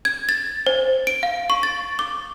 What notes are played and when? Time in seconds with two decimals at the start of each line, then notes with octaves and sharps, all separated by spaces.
0.05 G#6
0.29 A6
0.67 C5
1.07 D7
1.23 F5
1.50 C#6
1.63 A6
1.99 D6